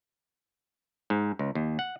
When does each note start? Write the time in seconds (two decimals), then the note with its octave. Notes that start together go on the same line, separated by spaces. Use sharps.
1.10 G#2
1.39 C#2
1.55 D#2
1.79 F#5